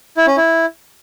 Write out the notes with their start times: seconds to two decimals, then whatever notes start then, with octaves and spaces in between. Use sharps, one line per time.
0.17 E4
0.27 C#4
0.37 E4